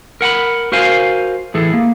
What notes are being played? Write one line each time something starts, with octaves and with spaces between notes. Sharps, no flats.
A#4 F#5 G#5 B5
F#4 A#4 C5 F5 G#5
A2 E3 G#4 A4
A#3